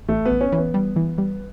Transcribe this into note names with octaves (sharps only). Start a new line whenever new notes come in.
A1 A3
B3
A1
C#4
E3
B3
G3
E3
G3